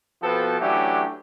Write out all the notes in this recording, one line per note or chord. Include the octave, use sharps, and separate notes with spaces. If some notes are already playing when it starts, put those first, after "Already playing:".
B2 F3 B3 C4 F#4 A4
E3 F#3 A3 C#4 D4 G4